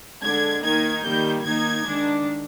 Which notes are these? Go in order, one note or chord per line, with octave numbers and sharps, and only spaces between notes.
D3 G#3 D4 G#6
D#3 A#3 D#4 G#6
D#3 G3 A#3 G6
D#3 A#3 D#4 G#6
D#3 G#3 D4